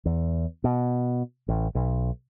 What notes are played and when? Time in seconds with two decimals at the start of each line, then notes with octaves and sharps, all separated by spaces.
0.06 E2
0.64 B2
1.48 A1
1.75 B1